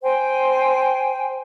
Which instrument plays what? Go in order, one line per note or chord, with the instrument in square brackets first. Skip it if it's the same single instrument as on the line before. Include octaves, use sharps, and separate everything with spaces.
[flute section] C5 G5 G#5